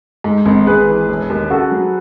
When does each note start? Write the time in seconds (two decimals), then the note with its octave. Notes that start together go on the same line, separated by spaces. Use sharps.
0.24 G#2
0.46 G#1
0.66 G#1 G#4 B4
0.88 E3
1.08 E1
1.30 D#2
1.50 C#3 F#4 A4
1.72 F#3